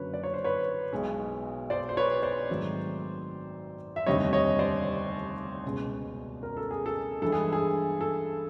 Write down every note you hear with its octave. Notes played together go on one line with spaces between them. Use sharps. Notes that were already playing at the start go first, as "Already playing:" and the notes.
Already playing: F#1 F#2 D3 F#3 A#3 B4 C#5
D5
C#5
C5
B4 C#5
B1 B2 G#3
C5 D5
C5
B4 C#5
C5 D5
G#2 D#3 F#3 A3 C4
E5
F1 D#2 D3 G3 C4 C#5 D#5
C#5 D#5
C5 D5
C#2 B2 G#3
A#4
A4
G#4
A4
G2 E3 G#3 A4
G#4
G#4
A4